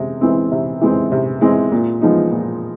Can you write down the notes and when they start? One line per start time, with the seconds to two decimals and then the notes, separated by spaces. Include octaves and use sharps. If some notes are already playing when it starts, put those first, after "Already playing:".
Already playing: C3 G#3 C4
0.21 E3 G#3 C4
0.52 C3
0.81 E3 G#3 C4
1.12 C3
1.41 E3 G#3 C4
1.72 A#2
2.01 F3 G#3 B3 D#4
2.31 A#2